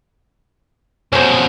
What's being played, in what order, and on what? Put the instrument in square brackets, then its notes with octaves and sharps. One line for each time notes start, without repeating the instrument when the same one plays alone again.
[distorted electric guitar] F2 B2 [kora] C#4 C5